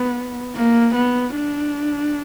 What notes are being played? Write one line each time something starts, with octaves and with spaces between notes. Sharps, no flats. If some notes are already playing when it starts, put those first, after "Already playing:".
Already playing: B3
A#3
B3
D4